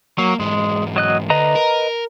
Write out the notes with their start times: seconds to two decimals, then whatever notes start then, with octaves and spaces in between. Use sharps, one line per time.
0.18 F#3 A#3
0.40 G#2 E3 G#3
0.96 F#3 D#5 F#6
1.30 D2 B4 D#5 A#5
1.56 A#4